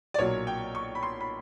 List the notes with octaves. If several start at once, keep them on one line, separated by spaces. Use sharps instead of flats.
D5
B1 A#2 F#3 C#5
G5
C#6
B5
C6
B5